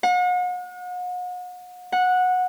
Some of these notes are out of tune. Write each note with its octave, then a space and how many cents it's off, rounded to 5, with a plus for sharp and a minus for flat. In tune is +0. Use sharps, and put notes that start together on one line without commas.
F#5 -40
F#5 -15